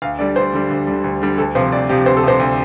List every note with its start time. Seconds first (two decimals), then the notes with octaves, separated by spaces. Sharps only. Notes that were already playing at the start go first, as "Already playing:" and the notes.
0.02 D2 F5
0.19 D3 G3 D5
0.36 D2 C5
0.53 D3 G3
0.70 D2
0.87 D3 G3
1.04 D2
1.22 D3 G3
1.38 D2 A4
1.55 C3 F3 C5
1.72 D2 D5
1.89 C3 F3 G4
2.06 D2 C5
2.17 A4
2.23 C3 F3 C5
2.40 D2